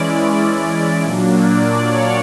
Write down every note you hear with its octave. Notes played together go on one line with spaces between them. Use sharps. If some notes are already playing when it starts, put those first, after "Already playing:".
Already playing: E3 G#3 C#4 E4 D5
A#2 F#3 A#3 D4
D5
C#5